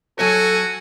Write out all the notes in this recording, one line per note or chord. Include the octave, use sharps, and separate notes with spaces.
F#3 F#4 A4 C#5 G#5